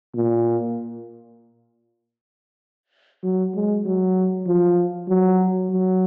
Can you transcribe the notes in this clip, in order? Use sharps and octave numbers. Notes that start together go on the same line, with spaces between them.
A#2
F#3
G#3
F#3
F3
F#3
F#3